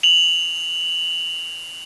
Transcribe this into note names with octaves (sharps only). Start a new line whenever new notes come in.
F7 F#7